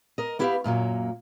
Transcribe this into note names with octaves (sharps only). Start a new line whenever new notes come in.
A#4 D#5
B3 E4 G4 B4 E5 F5
F#2 A#2 F#3 A#3